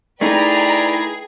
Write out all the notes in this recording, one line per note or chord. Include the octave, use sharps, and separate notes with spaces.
A3 D#4 E4 G#4 B4 D5 G5 A#5